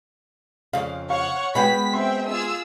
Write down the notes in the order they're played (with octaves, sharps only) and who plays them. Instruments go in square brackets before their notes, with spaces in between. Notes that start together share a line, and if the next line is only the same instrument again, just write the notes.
[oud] F2 C#3 [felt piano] F5
[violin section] C#5 F#5 C#6 [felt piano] F5
[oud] G#3 B3 F#4 [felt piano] G5 B5 [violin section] B6
[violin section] C4 E5 G5 [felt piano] C6
[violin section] F4 G#4 E6